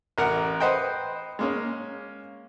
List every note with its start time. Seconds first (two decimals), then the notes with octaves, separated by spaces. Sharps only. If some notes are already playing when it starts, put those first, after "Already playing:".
0.18 A1 A#4 F#5
0.60 B4 C5 D#5 F#5 G5
1.39 G#3 A#3 C#4